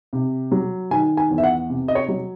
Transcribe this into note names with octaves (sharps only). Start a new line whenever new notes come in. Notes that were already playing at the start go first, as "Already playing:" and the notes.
C3
F#3
D#3 G#5
G#5
E2
E5
F#5
C3
D#5
C#5
F#3